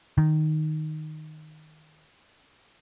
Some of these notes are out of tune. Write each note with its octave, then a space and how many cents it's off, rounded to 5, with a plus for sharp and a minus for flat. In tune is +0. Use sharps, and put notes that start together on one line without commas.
D#3 -5